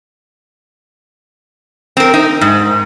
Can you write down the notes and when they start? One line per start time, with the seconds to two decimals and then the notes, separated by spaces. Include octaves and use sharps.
1.97 C4 A#4
2.14 D#4
2.41 G#2